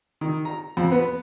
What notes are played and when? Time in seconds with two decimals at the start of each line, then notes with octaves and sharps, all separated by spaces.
0.21 D#3
0.45 A#5
0.77 F2
0.92 B3